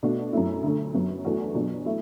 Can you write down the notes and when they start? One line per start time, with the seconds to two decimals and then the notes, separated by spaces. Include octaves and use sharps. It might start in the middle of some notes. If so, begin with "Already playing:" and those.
0.03 B2 A3 D4 F#4
0.33 F#2 F#3 A3 E4
0.63 D2 D3 A3
0.94 F#2 F#3 B3
1.25 E2 E3 A3 D4 F#4
1.55 B2 F#3 D4
1.86 A3 E4